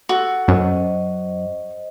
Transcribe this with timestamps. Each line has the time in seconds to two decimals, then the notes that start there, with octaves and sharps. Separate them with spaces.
0.09 F#4 A4 E6
0.48 F#2 C5 D#5